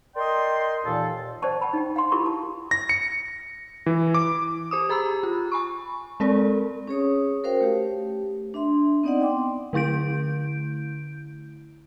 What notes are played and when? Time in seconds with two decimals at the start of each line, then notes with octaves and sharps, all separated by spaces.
0.16 A#4 D5 D#5 G5 C6
0.85 D#2 A#2 E3 A4 F5
1.42 C5 D5 G5 A5 C#6
1.61 F#5 A5 B5
1.73 D#4 G5
1.96 F5 F#5 C6
2.12 E4 F4 G4 A#4 B5 C#6
2.26 A5
2.71 A#6
2.89 C#7
3.86 E3
4.14 D6
4.71 G4 C5 D6 D#6
4.89 G4 G#4 A#5 B5 E6
5.23 F4
5.52 G#5 B5 C#6
6.20 G#3 C4 A4 A#4 D5
6.87 C#4 G#4 C#5 D#6
7.43 F#4 A#4 C5 F5 G5
7.61 A3 G4
8.54 D4 E5 C6
9.03 B3 C4 D#4 D5 D#5 F#5
9.21 G5 C6 D6
9.73 D3 A3 E4 G6 D7